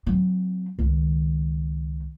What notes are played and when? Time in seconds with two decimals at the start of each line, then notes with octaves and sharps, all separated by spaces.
0.07 F#3 C4
0.79 C#2 D#3